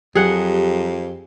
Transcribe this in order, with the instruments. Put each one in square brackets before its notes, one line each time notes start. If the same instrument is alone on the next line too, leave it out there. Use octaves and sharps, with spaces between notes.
[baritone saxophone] F2 [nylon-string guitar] F#3 [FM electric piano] G4 [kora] G#4 F#5